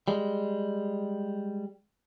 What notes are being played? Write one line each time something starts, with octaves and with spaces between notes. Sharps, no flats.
G3 G#3